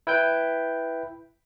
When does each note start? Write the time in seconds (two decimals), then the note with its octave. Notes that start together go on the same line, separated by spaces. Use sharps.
0.07 E4 B4 G5 G6